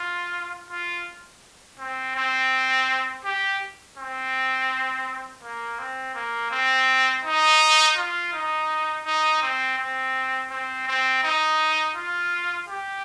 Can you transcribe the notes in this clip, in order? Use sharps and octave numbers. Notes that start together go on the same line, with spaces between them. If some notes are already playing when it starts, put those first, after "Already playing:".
Already playing: F4
F4
C4
C4
G4
C4
A#3
C4
A#3
C4
D#4
F4
D#4
D#4
C4
C4
C4
C4
D#4
F4
G4